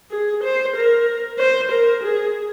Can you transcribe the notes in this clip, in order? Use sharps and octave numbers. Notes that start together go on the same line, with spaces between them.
G#4
C5
A#4
C5
A#4
G#4